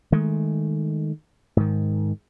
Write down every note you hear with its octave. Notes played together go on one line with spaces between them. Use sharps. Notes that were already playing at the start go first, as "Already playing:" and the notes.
D#3 G#3 A3
G#2 D#3